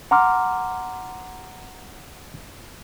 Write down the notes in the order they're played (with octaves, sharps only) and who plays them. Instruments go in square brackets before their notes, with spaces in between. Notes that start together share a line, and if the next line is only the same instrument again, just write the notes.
[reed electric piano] F#5 A#5 C6 D6 F6